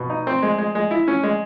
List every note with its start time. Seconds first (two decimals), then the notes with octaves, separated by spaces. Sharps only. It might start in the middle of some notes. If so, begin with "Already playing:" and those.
Already playing: B2
0.10 D#4
0.27 C4
0.43 G#3
0.58 G#3
0.75 G#3
0.91 E4
1.08 C#4
1.23 G#3